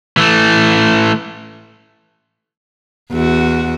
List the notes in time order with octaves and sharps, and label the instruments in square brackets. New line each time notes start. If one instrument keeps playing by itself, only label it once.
[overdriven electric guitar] E3 A3
[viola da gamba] E2 F#4